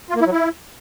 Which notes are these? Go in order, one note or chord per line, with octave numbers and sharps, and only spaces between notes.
F4
A#3
E4
F#3
E4